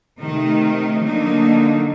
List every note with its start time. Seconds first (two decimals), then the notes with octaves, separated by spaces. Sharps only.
0.20 C3 D#3 A3 D#4
0.99 D3 F#3 A#3 D#4